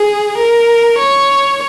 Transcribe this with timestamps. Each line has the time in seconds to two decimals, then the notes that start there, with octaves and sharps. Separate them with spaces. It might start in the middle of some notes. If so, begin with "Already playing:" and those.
Already playing: G#4
0.38 A#4
0.98 C#5